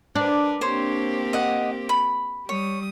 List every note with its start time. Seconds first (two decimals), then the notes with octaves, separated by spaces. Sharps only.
0.15 D4 A#4 B4
0.61 A#3 C4 G4 C5 C#5
1.33 D#5 F#5
1.89 B5
2.49 G3 C#5 D#6